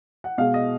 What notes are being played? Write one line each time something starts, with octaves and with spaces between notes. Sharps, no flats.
F#5
B2 G#3 F5
D#5